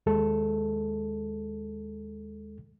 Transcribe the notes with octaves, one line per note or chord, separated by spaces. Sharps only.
D#2 G#3 A4